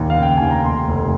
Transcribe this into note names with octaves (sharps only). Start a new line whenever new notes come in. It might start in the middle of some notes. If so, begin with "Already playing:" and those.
Already playing: A#1 D#2 A#5
F5
C#3
G5
D#2 G#5
A#5
F1 C6
F1